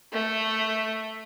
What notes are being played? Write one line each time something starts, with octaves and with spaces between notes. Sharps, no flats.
A3